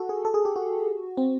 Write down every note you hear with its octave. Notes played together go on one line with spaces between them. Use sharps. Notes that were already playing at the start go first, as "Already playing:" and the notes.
Already playing: F#4 A4
G#4
A4
G#4
G4
F#4
C4